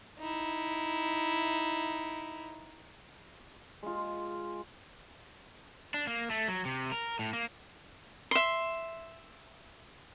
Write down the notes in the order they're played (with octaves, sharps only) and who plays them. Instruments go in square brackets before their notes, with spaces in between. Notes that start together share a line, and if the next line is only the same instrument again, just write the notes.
[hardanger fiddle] D#4 E4
[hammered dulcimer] G#3 F4
[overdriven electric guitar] D4
A#3
A3
F#3
C3
A#4
A2
A#3
[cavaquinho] E5 C6